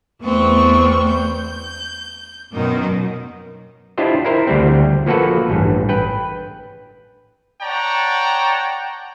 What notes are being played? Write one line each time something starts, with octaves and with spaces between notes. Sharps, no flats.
E2 A3 B3 C4 C#6
G6
F#2 B2 D#3 D#4
D4 E4 F4 G4 C5 D#5
E4 A#4 C5
D2 G3 C4
F3 A#3 F#4 A4 B4
A1 G2
B4 G5
C#5 D5 F#5 G5 A5 A#5